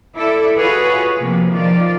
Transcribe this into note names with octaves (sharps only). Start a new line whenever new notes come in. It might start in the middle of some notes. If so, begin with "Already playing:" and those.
E4 A4 D5 E5
F4 F#4 G#4 B4 C#5
C3 F3 A#3
D#3 F3 F4 D5